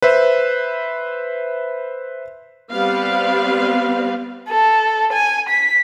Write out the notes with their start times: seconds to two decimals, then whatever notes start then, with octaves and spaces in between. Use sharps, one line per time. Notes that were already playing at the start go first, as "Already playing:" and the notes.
0.02 B4 C5 E5
2.71 G3 B3 C4 B4 F5
4.49 A4
5.12 G#5
5.49 B6